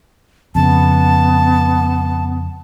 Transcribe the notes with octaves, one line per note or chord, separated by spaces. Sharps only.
F2 C#3 B3 A5